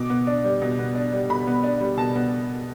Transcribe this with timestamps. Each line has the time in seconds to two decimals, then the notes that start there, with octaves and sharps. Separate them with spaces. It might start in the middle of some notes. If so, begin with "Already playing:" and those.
Already playing: B2 D6
0.10 B3
0.27 D4
0.44 G3
0.61 B2
0.79 B3
0.95 D4
1.12 G3
1.29 B2 B5
1.47 B3
1.63 D4
1.81 G3
1.97 B2 A5
2.16 B3